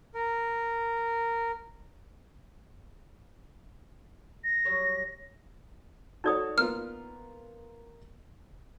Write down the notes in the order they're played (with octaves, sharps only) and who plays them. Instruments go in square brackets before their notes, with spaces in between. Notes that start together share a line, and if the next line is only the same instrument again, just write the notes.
[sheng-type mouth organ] A#4
[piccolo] A#6
[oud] F#3 G3 C#5
[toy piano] D#4 D5 D#6 [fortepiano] F#4 A4 C#5
[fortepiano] A#3 B3 F4 [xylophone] F6